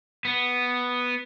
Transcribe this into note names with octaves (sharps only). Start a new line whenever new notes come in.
B3